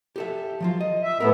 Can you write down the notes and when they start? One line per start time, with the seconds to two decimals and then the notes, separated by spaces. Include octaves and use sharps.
0.16 G4 A4 E5
0.60 F3 F#3 F4
0.81 D#5
1.02 E5
1.20 A2 A3 B3 A#4 E5